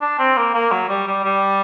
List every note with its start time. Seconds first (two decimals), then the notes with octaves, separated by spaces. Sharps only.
0.01 D4
0.19 C4
0.37 A#3
0.54 A#3
0.72 F#3
0.89 G3
1.07 G3
1.24 G3